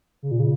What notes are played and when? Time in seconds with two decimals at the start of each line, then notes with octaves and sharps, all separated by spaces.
0.23 C#3
0.31 A#2
0.40 C#3